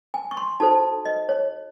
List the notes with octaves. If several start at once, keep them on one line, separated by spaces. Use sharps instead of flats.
G#5
C#6
C6
D#4 F#4 A4 C5 A5
D#5
C#5